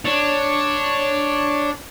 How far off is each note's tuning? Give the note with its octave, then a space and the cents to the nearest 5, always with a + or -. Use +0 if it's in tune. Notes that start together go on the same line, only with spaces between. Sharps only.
D4 +0 C#5 +0